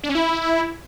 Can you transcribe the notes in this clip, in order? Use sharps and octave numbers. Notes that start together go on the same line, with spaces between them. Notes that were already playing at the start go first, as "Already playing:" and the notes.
D4
C#4
E4